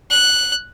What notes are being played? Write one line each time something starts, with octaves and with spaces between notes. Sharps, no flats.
F#6